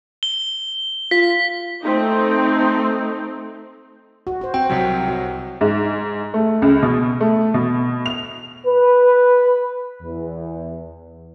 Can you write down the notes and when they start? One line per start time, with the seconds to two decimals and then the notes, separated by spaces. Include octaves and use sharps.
0.23 G7
1.11 F4 B6
1.82 A3 C4 D#4
4.27 F#4
4.41 F#4 C5
4.54 C4 F#4 G5
4.70 C2 C3 F#3
5.08 F#4
5.61 G#2
6.34 A3
6.62 C#2
6.83 B2
7.21 A3
7.54 B2
8.06 F7
8.67 B4
10.02 E2